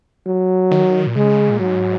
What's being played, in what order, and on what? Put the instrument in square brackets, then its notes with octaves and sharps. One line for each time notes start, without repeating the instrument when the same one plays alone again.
[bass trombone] F#3
[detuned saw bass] D#3
A#2
[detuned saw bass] C#3 [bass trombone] G#3
[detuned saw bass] A#2
[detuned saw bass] G#2 [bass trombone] F#3